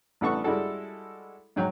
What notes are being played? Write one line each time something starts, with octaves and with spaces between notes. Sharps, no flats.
A1 G3 B3 A4 F#5 C#6
G3 G#3 E4 F#4 A4
G#2 F#3 G5 A#5